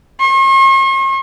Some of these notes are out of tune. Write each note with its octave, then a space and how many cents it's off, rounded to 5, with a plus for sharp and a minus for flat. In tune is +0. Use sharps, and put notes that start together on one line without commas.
C#6 -45